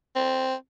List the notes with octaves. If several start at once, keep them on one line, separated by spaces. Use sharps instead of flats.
C4